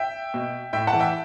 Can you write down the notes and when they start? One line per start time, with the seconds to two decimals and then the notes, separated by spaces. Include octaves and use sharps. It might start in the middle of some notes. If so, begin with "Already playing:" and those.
Already playing: E5 G5
0.34 B2
0.73 A2 E5 G5
0.87 F#5 A5
0.93 E3
1.00 E5 G5